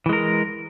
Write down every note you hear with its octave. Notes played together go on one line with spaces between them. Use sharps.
E3 G#3 A#4